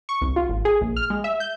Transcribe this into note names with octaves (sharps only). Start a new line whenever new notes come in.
C#6
C2
F4
G#1
G#4
A#1
F6
G#3
E5
G6